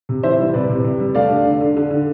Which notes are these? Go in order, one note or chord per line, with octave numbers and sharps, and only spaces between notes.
C3
E3 C5 E5
G3
C3 B4 D5
C3
C3
G3
A3 D5 F5
D3
D3
D3
D3
D3